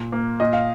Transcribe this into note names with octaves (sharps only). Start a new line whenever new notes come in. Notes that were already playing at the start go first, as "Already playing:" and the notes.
Already playing: A#2
A#3
A#2 D#5
F5